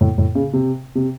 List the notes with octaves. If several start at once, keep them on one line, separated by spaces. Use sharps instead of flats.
A2
A2
C#3
C3
C3